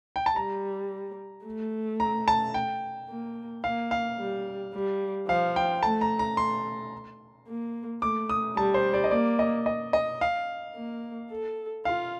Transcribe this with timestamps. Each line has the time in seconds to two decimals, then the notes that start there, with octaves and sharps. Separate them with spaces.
0.16 G5
0.26 A5
0.36 G3 A#5
1.46 A3
2.00 A#5
2.28 A5
2.54 G5
3.09 A#3
3.64 A#3 F5
3.91 F5
4.19 G3
4.73 G3
5.28 F3 F5
5.56 G5
5.83 A3 A5
6.01 A#5
6.19 A#5
6.37 A3 C6
7.48 A#3
8.02 A3 D6
8.29 D#6
8.56 G3 A5
8.74 C5
8.94 D5
9.04 D#5
9.11 A#3 D5
9.39 D#5
9.66 D#5
9.93 D#5
10.21 F5
10.75 A#3
11.31 A4
11.85 F4 F5